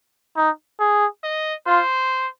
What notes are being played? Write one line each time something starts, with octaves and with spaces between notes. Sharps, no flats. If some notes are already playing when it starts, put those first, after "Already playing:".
D#4
G#4
D#5
F4 C5